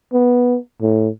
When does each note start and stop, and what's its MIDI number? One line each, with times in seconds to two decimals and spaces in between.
0.13 0.58 59
0.81 1.08 45